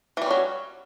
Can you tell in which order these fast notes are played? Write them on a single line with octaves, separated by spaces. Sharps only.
E3 G3 C#4 F#3